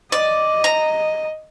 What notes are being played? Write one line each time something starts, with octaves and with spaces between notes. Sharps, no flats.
D5 D#5
A#5